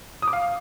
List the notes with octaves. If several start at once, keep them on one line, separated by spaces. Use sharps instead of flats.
D#6
D6
F5